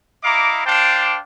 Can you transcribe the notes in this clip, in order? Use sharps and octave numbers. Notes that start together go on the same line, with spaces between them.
E4 D#5 F5 A#5 D6
D4 C5 F5 G5 A5 D6